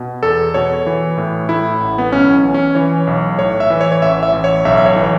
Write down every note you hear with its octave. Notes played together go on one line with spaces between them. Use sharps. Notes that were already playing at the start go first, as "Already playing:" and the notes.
Already playing: B2
E2 A4
B2 C#5
E3
A2
A2 E4
A1
B3
B1 C#4
E3
C#4
E3 C#5
B1
A2 C#5
E5
E3
C#5
C#5
A1 E5
E5
A1
C#5
B1 E5
E5
C#5
E3